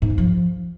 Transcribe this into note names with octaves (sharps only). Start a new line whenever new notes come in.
G#2
C#3
F3